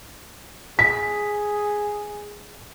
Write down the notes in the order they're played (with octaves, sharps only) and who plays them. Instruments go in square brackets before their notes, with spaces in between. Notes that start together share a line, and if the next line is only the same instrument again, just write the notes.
[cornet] G#4 [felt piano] B6